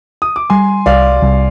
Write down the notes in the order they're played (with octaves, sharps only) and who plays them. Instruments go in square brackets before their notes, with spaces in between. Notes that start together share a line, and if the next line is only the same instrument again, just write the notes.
[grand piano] D#6
D6
[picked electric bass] G3 [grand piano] G#5 C6
[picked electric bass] C2 [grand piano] D5 F5
[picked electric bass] C2